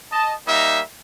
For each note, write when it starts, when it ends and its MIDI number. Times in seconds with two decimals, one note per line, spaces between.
0.11 0.33 75
0.11 0.33 81
0.46 0.80 55
0.46 0.80 58
0.46 0.80 63
0.46 0.80 76